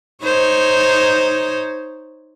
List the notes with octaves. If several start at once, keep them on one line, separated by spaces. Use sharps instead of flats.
D#4 C5 C#5